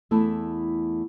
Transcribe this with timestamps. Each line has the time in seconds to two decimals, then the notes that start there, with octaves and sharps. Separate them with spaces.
0.11 E2 A3 E4 A5